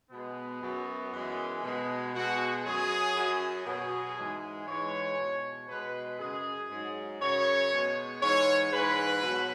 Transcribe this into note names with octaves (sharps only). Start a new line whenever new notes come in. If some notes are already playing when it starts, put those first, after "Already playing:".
B2 G#3 B3
F#2 F#3
F#2 E3 G#3
B2 G#3
B2 G#3 F#4
F#2 F#3 G#4
F#2 F#3
B2 F#3 G#4
G#2 E3 G#3
G#2 E3 G#3 C#5
B2 G#3
B2 G#3 B4
F#2 C#3 G#3 G#4
G#2 F#3
F#2 C#3 F#3 C#5
B2 G#3
G#2 E3 G#3 C#5
G#2 E3 G#3 B4
B2 F#3